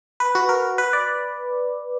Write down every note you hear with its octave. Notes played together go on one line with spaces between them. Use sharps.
B4
F#4
A#4
B4
D5